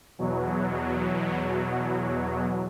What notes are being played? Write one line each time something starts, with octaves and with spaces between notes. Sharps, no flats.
E2 B2 F#3